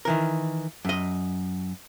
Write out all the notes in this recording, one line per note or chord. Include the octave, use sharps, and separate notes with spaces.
D#3 E3 A#4
F#2 D#5